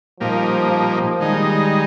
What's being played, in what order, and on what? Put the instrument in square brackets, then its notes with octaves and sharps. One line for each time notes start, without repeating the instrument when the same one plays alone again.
[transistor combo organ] A#2 G3 A#3 D#4 [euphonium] F3
[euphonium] F3
[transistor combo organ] D#3 G#3 D#4 [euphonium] G3